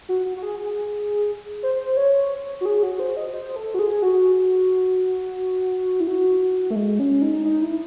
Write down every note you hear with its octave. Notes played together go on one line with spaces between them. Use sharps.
F#4
F#4
F#4
G#4
G#4
C5
C#5
F#4
G#4
F#4
C5
D#5
C5
A4
F#4
G#4
F#4
E4
F#4
A3
G#3
C#4
D#4
D#4
E4